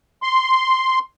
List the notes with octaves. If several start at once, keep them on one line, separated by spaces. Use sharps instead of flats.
C6